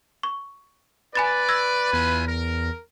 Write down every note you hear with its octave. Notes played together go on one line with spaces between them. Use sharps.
C#6
B4 D5 G#5 B5 A6
E6 G#6 A#6
E2 E4 F4 G#5
A#4